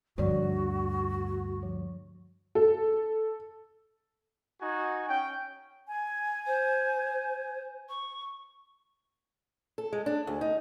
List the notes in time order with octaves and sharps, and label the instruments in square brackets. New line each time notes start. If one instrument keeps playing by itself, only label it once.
[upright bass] D2 G2 [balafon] D3 F3 D5 [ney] F#4
[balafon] F3
[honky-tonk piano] A4
[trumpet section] D#4 F#4 G#5
C#4 G5
[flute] G#5
[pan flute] C5
C#6
[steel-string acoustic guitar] A4
G#3
D4
D2
D#4